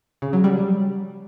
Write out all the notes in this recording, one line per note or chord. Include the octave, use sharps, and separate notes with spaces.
C#3
F#3
G3